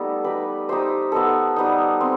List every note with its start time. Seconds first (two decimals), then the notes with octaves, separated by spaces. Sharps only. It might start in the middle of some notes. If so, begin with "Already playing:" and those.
Already playing: G3 A3 B3 D#4 A4
0.24 D#4 G4 B4
0.69 D#4 G4 C5 E5
1.12 B3 D#4 A4
1.56 G3 B3 D#4
2.01 C4